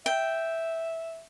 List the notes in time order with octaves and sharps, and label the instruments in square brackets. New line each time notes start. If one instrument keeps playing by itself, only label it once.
[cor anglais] E5 [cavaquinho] G5